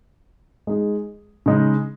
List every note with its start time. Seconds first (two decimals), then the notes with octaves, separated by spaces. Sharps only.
0.67 G#3 D#4 G#4
1.46 C#3 G#3 D#4